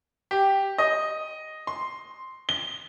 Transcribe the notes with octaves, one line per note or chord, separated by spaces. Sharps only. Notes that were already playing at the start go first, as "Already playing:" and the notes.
G4
D#5
C6
G7